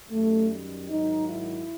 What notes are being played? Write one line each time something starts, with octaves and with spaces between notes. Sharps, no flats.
F#2 D#3 G3 A3
G#2 D#3 F#3 D#4
E4